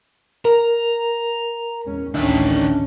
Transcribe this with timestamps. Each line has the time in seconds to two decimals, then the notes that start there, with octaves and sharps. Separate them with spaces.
0.45 A#4 A#5
1.85 E2 G#3 C#4
2.14 A1 D2 D#3 C#4 D4 E5